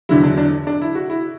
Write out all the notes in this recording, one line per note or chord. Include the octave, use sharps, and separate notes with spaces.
E2 D3 F#3 E4
D4
D4
D4
E4
F#4
E4